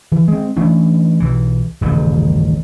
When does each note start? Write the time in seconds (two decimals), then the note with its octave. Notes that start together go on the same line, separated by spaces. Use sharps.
0.12 E3
0.28 G#3 C4
0.57 E3 A3 C#4 D4
1.20 B1 E3
1.81 D#1 A1 G2 C#3